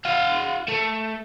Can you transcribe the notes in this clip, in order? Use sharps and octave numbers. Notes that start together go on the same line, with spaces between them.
F#4 F5
A3